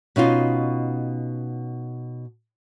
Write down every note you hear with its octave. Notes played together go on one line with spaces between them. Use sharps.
B2 C#4 D#4 F4